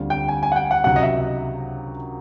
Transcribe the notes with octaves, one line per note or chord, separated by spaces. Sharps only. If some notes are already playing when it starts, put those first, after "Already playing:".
Already playing: D2 D3 G3 C4 F4
G5
G#5
G#5
F#5
G5
F#5
C#2 C3 D#3 F#3 F#5
D#5
E5